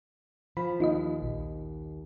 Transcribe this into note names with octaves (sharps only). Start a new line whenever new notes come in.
F3 B5
D#2 D#4 F4 D#5
A#1